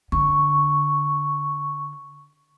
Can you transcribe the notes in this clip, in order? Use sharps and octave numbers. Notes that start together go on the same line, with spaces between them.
D3 C#6